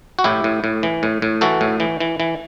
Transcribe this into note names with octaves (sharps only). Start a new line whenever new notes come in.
F#4
A2 E4 G4
A2
A2
E3
A2
A2
E3 F#4 A4
A2
E3
E3
E3